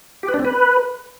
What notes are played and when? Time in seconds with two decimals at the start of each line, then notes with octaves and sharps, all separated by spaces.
0.23 G4
0.29 B4
0.34 D4
0.39 C4
0.45 B4